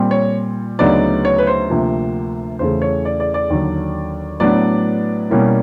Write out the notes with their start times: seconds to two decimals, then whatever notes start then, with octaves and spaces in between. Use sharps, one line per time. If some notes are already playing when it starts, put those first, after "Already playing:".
Already playing: A#2 G3 C4
0.11 C#5
0.79 D2 C#3 F#3 B3 D#4 D5
1.25 C#5
1.38 B4
1.47 C5
1.69 D2 C3 F3 A#3
2.59 E2 C#3 E3 A3 C5
2.82 C#5
3.05 D5
3.20 D5
3.34 D5
3.50 D#2 D3 F#3
4.40 A2 F#3 B3 D4 D5
5.30 B2 G3 A#3 C#4 E4